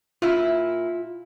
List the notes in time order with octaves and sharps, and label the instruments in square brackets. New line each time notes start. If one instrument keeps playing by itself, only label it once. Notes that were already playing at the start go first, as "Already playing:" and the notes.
[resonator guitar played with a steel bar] A#2 E4 [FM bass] F4